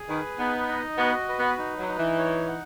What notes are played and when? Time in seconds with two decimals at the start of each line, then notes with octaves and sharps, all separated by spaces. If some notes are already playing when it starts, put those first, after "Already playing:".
Already playing: G#4
0.09 D#3 B4
0.38 B3 D#4
0.69 D#5
0.98 B3 F#4
1.29 B4
1.39 B3
1.58 D#4
1.78 F#3
1.88 D#4
1.98 E3
2.18 C#5
2.48 F#5